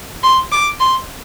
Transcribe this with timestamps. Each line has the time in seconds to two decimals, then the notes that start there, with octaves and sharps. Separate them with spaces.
0.23 C6
0.52 D6
0.80 C6